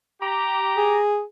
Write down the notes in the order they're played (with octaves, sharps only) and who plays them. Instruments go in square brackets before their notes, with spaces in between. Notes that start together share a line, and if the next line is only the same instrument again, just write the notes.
[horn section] G4 A#5
[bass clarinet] G#4